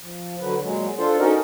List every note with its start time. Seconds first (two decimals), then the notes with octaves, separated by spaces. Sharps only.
0.01 F3
0.41 D3 F#3 B4
0.63 A#2 F#3 G#3
0.99 D4 F4 A4 C5
1.20 C#4 D#4 F#4 A4 A#4 D#5